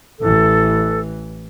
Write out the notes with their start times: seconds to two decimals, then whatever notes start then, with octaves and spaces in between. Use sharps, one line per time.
0.19 A1 E3 A4